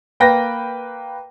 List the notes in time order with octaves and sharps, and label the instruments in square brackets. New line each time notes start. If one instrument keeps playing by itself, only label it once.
[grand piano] A#3 B4 G5 A#6